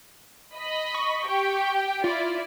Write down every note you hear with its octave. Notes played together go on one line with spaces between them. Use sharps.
D#5 B5
C#6
G4 G5
E4 F4 D5